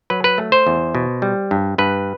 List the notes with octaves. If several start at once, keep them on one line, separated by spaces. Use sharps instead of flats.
F#3 B4
B4
A3
C5
E2
B2
G3
G2
G2 B4